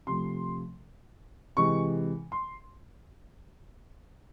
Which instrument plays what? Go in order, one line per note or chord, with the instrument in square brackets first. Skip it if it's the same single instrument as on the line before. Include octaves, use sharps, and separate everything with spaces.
[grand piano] C3 F3 A3 C6
C3 E3 G#3 C#6
C6